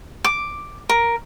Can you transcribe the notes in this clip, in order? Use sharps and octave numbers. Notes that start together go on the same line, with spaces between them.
D6
A#4